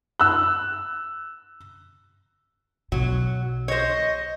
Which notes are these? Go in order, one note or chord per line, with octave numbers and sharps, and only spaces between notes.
E6 F#6
B1 B2 F#3
C5 C#5 D#5